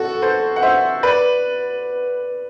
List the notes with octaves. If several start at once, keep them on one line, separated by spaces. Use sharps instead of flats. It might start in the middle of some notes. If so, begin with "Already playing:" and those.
Already playing: F#4 A4
A4 C5
F#5
C5 E5
B4 D5